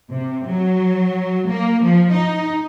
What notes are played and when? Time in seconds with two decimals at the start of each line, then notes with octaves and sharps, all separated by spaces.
0.11 C3
0.47 F#3
1.49 A#3
1.84 F3
2.13 D#4